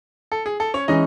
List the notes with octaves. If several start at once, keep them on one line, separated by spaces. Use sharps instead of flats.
A4
G#4
A4
C#4 C#5
E3 G#3 C#4 D#4 D#5